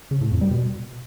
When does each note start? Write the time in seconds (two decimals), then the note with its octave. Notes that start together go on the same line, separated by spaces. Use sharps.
0.11 C#3
0.21 A2
0.31 F2
0.41 G3
0.51 B2